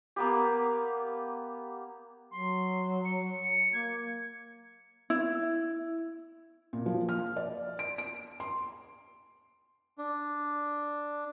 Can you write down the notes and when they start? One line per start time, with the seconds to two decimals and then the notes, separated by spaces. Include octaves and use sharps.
0.16 A#3 B3 G4
2.31 F#3 C6
3.05 C#7
3.73 A#3 G#6
5.10 E4
6.73 A#2
6.86 F3
7.09 F6
7.36 D5
7.79 D7
7.98 D7
8.40 C6
9.98 D4